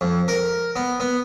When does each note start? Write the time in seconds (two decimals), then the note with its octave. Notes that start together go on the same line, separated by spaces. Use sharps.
0.01 F2
0.28 A#4
0.76 B3
1.00 B3